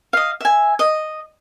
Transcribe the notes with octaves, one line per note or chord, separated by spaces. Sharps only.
D#5 F5
E5 G#5
D#5